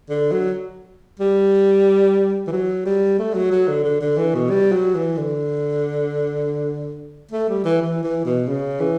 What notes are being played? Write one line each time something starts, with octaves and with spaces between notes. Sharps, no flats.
D3
F#3
G3
E3
F#3
G3
A3
F#3
F#3
D3
D3
D3
E3
B2
G3
F#3
E3
D3
A3
G3
E3
E3
E3
B2
C#3
E3